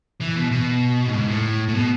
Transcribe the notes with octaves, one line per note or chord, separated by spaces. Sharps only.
E3
B2
B2
A2
G#2
A2
A2
B2